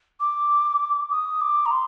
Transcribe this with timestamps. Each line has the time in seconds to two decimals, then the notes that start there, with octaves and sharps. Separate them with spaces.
0.20 D6
1.10 D#6
1.41 D6
1.65 A#5
1.71 C6